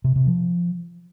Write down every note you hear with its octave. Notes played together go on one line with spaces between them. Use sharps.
C3
C3
F3